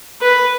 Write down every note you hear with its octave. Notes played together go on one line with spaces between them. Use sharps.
B4